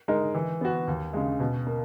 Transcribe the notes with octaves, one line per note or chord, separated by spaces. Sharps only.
G#3 D#4 A#4
E3
B3 F#4
D#2
C#3 G#3
B2
A#3